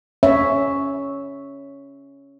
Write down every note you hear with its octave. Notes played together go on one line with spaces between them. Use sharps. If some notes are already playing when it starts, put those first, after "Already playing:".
C#4 C#5 E5